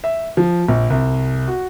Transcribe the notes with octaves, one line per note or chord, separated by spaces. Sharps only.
E5
F3
A#1
C2
F#4